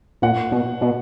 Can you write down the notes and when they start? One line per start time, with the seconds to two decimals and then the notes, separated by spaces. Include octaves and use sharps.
0.22 A#2 F#5
0.51 B2
0.81 B2